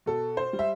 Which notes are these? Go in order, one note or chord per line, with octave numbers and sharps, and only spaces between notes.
B2 A4
C5
G3
E5